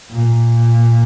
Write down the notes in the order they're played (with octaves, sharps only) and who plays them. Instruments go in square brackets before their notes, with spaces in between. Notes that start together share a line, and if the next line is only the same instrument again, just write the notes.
[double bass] A#2